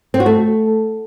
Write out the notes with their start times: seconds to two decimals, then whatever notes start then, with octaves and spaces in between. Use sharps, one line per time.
0.14 C4
0.20 F#4
0.26 A3